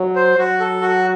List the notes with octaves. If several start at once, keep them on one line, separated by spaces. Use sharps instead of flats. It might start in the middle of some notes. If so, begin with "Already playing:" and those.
Already playing: F#3
C5
F#3 F#4
A4
F#4